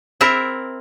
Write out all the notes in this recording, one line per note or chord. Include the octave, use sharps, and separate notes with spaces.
C4 E4 A#4